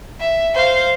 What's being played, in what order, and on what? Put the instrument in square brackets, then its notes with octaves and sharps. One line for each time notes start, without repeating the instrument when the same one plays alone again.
[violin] E5
C5 F5